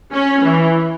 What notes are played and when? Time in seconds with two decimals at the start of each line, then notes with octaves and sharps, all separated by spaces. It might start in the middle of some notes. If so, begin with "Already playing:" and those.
0.13 C#4
0.44 E3